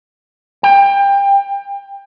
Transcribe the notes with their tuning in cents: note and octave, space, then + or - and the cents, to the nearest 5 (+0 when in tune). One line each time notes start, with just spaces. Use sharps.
G5 +25